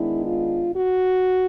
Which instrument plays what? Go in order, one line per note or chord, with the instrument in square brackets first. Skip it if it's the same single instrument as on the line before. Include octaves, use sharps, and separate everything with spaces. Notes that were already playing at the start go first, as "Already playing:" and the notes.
Already playing: [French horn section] D#3 G#3 B3 D4 E4
F4
F#4